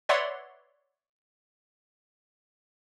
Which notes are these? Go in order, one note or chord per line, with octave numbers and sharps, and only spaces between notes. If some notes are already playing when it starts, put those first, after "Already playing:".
B4 C#5 D5 E5 F#5 C6